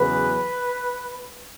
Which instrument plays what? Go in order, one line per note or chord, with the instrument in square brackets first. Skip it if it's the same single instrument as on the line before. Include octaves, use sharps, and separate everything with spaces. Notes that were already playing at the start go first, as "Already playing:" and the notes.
Already playing: [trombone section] E2 C#3 F#3 B3 B4